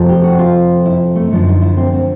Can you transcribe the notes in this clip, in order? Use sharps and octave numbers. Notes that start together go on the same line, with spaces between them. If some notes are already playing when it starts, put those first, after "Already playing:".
Already playing: F2 C3 F3 A3
G4
F#4
F4
E4
A3
F#2 D3 F3
D#4
E4
C4
C4